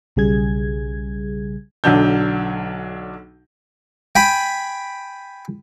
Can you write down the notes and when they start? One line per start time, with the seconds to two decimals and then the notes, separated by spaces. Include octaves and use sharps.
0.16 B1 C#3 G3 G#4 G#6
1.84 B1 D3 F#3 D4 G6
4.15 G5 G#5 B5